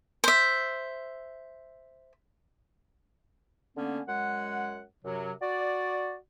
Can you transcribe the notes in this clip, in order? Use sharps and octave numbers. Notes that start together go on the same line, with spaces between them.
C5 E5
D3 A#3 B3 C#4
F#2 G#3 F#5
F#2 C3 F#3
F#4 D5